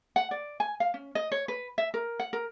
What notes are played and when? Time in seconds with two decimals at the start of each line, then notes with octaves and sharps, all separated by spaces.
0.16 F#5
0.31 D5
0.60 G#5
0.80 F5
0.94 C#4
1.15 D#5
1.32 C#5
1.48 B4
1.78 E5
1.94 A#4
2.20 F#5
2.33 A#4